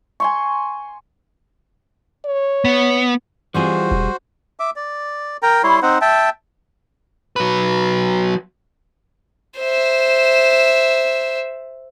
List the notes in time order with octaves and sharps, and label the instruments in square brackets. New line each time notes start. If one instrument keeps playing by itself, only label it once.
[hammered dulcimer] G#5 C6 C#6
[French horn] C#5
[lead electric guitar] B3
[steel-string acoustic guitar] E3 C4 F4 [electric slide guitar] G3 G#4 [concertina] F#4 C5
[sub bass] E1
[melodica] E5 D6
D5
A#4 G5 A#5
G3 E4 C#5 C6
C4 D#4 C5 F#5
E5 G5 A5
[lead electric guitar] F#3 B4
[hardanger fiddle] C5 E5